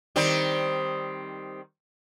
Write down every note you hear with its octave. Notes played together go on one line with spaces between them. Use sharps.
D#3 G3 C4